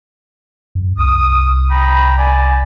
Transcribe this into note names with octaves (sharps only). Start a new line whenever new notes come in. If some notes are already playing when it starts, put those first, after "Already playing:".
F#2
C2 D#6
G5 A#5 B5
D5 G#5